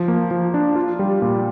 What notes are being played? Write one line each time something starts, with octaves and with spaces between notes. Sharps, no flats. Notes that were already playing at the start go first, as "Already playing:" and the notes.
Already playing: F3
A#3
F3
D4
F4
G3
A#2